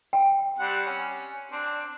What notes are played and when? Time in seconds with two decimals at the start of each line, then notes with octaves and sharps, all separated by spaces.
0.13 G5
0.59 G3 C4 F#5
0.86 C#4
1.52 C4 D4